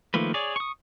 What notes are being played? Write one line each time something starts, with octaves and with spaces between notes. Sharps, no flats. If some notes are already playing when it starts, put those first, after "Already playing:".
D#3 F3 A3 A#3 B4
G#4 C#5 D5
C#6 D#6